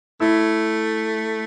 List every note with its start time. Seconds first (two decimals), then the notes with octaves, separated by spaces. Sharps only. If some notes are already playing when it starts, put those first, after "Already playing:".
0.20 A3 E4